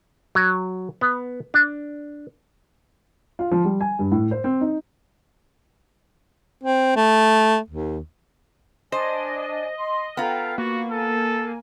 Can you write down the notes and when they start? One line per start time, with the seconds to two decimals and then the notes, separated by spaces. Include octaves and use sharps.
0.35 F#3
1.01 B3
1.54 D4
3.39 F4
3.51 F3
3.65 G3
3.81 G#5
3.99 G2
4.12 A2
4.31 C5
4.44 C4
4.61 D#4
6.64 C4
6.96 A3
7.70 D#2
8.92 D4 C5 D5 D#5 G#5
9.78 C6
10.17 B3 F4 A4 F5 G5 A#5
10.58 A#3 F#4 C#6
10.91 A4 A#4 G#5